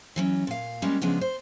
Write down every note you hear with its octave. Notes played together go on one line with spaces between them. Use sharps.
E3 F#3 C#4
A#2 F5
G3 G#3 A#3 C#4 G4
C#3 F3 G#3 B3 C#4 D4
C5